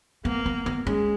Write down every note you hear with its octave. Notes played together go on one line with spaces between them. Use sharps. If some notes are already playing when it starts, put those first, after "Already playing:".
A#3 B3
B3
B3
G#3 C#4